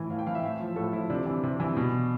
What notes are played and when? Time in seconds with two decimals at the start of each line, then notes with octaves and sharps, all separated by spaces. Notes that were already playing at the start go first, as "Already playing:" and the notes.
Already playing: A2 E3
0.10 A2 F5
0.19 G5
0.27 E3 F5
0.35 E5
0.43 A2
0.60 F3
0.76 A2 A4
0.93 F3 E4
1.10 C3 D4
1.27 E3
1.43 C3
1.60 E3
1.77 B2